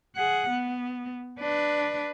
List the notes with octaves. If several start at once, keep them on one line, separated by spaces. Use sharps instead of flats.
G#4 F#5
B3
D4 B4